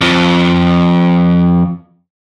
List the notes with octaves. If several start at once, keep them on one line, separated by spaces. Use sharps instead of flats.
F2 F3